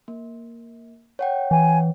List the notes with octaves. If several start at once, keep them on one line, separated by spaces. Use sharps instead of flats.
A#3
C#5 F#5 G5
E3 G#5